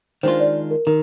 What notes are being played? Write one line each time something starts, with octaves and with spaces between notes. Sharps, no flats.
D#3 G#3 D4 F4 C5
D5
A#4
D#3 A#4